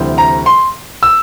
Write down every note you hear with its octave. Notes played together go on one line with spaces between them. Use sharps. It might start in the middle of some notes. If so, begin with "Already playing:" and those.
Already playing: D2 C3 E3 G3
A#5
C6
E6